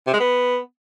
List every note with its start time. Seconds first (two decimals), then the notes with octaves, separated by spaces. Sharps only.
0.07 C3
0.14 G#3
0.20 B3